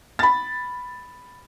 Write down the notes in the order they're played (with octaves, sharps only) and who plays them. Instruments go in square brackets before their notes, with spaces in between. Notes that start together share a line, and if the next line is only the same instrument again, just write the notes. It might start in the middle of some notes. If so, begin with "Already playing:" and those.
[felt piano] B5 A6